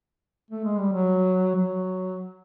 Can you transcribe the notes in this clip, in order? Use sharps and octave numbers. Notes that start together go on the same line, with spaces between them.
A3
G#3
G3
F#3
F#3